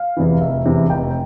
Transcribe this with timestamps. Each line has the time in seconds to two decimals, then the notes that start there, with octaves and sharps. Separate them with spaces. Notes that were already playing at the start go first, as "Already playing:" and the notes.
Already playing: F5
0.17 E2 C3 E3
0.41 F1 E5
0.65 E2 C3 E3
0.90 F1 G5